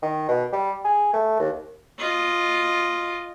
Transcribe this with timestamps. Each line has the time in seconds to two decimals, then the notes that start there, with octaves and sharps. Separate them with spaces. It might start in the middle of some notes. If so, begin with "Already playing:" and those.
0.02 D#3
0.29 B2
0.52 G3
0.84 G#4
1.13 A3
1.39 D#2
1.98 F4 D#5